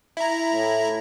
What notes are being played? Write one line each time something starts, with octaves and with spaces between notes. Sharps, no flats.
E4 A#5
A2